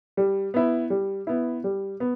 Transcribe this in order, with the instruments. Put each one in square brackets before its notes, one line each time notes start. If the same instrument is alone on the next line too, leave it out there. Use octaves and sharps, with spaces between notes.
[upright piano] G3
B3 E4
G3
B3 E4
G3
B3